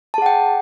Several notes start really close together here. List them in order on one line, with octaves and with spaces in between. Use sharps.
A5 G#4 F#5 G5